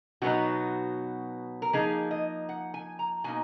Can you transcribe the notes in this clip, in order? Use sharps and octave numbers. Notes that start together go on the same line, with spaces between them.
B2 F#3 B3 D#4 F#4
A#4
F3 A#3 D#4 G#4
D#5
F#5
G#5
A#5
B2 A#3 D#4 G#5